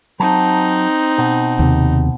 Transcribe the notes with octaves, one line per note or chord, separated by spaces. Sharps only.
F#3 C4 D#4 A5
B2
D#2 C3